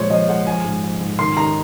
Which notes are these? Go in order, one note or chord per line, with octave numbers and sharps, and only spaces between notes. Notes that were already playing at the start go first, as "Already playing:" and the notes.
Already playing: A#2 F3 G#3 C5 C#5
F3 D#5
G#3 F#5
F3 G#5
G#2
F3
G#2
D#3 C6
D#3 A#5